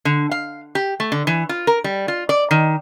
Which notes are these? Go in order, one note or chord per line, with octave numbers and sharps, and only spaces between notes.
D3
F5
G4
A3
D3
E3
F4
A#4
G3
F4
D5
D#3